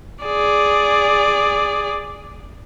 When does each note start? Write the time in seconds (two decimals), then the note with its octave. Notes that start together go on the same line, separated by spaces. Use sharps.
0.25 G#4 D5